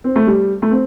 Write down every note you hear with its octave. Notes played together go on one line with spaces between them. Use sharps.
C4
A3
G3
A3
C4